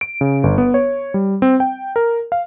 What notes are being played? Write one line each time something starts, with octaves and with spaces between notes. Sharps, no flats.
D7
C#3
G1
B3
C#5
G3
C4
G5
A#4
F5